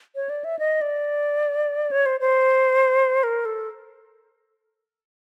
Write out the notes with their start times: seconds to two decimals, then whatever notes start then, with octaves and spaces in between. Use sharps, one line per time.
0.15 C#5
0.29 D5
0.44 E5
0.59 D#5
0.81 D5
1.91 C#5
2.06 C5
2.20 C5
3.23 A#4
3.45 A4